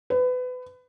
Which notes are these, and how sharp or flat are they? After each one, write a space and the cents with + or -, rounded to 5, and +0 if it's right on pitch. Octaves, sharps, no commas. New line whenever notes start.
B4 +25